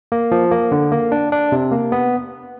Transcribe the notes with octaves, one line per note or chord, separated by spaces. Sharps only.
A#3
F3
A#3
D3
A#3
D4
D4
C3
A#3
B3